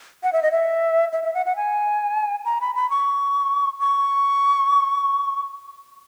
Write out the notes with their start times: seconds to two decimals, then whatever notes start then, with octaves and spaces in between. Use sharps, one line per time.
0.23 F#5
0.33 E5
0.43 D#5
0.52 E5
1.13 E5
1.23 E5
1.34 F#5
1.46 F#5
1.56 G#5
2.45 A#5
2.61 B5
2.75 B5
2.90 C#6
3.80 C#6